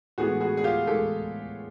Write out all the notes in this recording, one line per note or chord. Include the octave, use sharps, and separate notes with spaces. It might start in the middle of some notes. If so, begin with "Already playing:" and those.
A2 E3 G#3 B3 F#4 G#4
F#4 G#4
G#4
F4 G4
A2 E3 G#3 B3 G4 A4